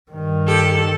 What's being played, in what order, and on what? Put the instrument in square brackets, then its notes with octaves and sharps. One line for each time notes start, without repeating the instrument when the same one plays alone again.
[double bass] G2 D#3
[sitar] G4 [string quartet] A4